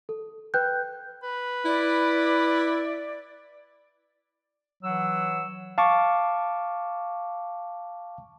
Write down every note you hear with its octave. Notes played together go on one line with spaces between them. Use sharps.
A4
B4 G5 F#6 G6
B4
E4 D5
E3 F#3 F#5 E6
F5 A5 C#6 D6